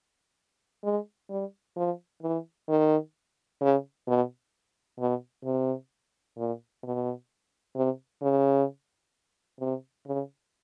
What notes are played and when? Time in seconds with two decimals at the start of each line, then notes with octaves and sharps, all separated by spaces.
0.84 G#3
1.30 G3
1.77 F3
2.23 E3
2.69 D#3
3.61 C#3
4.07 B2
4.99 B2
5.45 C3
6.38 A#2
6.83 B2
7.75 C3
8.22 C#3
9.60 C3
10.06 C#3